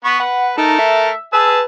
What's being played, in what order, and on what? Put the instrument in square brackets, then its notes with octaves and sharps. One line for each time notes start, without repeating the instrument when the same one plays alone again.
[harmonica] B3 B4 C#6
[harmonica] B4 [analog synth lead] F#5
[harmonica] A3 A4 A#4 [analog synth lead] D#4
[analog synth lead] E5
[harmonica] G#4 A5 E6 [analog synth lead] B4